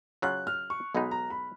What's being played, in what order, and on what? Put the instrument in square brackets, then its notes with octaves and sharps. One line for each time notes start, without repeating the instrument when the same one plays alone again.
[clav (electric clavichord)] C#3 F#3 C#4 F4 [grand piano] F#6
[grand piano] F6
C#6
[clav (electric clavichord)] B1 B2 G#3 D#4 [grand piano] B5
[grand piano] A#5
B5